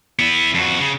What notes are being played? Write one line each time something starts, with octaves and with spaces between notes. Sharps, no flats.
B3 E4
F2 F#4
C#3